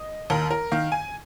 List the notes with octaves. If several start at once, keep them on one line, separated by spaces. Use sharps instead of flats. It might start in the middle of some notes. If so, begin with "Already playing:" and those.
Already playing: D#5
D#2 A#4
A#4
D#3 F5
G#5